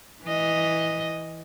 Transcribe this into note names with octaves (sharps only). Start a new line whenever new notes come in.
E3 D#5